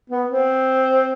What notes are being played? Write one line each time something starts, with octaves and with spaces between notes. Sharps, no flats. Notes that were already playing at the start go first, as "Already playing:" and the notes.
B3
C4